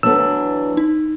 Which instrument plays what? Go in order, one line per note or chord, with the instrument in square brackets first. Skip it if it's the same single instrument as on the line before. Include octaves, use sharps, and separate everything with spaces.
[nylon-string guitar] F#3 B3 [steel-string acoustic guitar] D4 A4 [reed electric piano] E6
[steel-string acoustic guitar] E3 D4
[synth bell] D#4